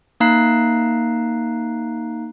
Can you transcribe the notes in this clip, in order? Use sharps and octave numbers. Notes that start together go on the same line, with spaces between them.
A#3 D#4 F5 A#5 F#6 C7